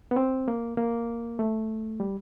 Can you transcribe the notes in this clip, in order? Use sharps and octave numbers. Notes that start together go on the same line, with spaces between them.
B3
C4
A#3
A#3
A3
G3